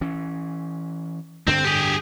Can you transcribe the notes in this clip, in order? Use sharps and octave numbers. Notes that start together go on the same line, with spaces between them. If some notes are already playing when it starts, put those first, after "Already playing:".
E3 C#4
G2 D3 C4 D4
G4 G#4